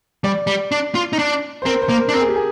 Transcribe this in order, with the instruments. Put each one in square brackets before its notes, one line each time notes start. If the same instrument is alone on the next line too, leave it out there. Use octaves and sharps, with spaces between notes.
[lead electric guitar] G3 [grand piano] D5
[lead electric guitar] G3
D4
F4
D#4
D4
[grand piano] C5
[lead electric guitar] C4 [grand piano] A#4
[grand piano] C5
[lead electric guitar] A#3
[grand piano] A#4
[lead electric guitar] D4
[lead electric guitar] C4 [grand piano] A#4
[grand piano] G#4
G4
G#4